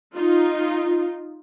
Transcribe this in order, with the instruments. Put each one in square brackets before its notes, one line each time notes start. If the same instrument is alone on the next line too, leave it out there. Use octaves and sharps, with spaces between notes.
[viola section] D#4 F4